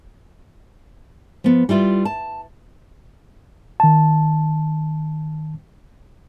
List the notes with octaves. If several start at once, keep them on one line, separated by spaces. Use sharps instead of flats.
F3 B3
G3 E4 F4 B4
A5
D#3 A5